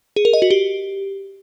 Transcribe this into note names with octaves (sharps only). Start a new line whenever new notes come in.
G#4
A#4
D#5
F#4
G4